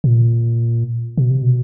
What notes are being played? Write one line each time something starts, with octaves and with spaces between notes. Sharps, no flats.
A#2
B2
C3
B2